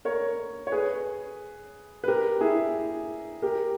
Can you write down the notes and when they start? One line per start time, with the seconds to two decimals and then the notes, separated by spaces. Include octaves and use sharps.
0.05 A#4 C#5
0.67 C#5
0.72 G#4 B4
2.04 B4
2.08 G4 A#4
2.41 E4 G#4
3.42 G4 A#4